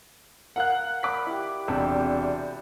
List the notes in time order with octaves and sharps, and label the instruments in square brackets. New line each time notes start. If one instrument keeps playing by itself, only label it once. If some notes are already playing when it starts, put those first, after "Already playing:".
[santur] A#4 F5 [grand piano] F#5 F#6
[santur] D5 B5 [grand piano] D6 B6
[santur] E4 G4
[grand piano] E1 C3 D4 [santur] A5 E6